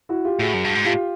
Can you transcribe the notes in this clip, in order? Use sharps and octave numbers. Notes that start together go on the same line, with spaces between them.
E4 F#4
F4 G4
A2 F#4 G#4
F#2
G2
G#2
A2 F4 G4